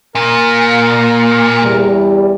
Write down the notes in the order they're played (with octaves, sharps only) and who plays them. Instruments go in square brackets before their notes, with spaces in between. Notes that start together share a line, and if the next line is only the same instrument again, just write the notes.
[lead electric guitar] A#2 [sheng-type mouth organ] A#4
[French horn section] E2 G3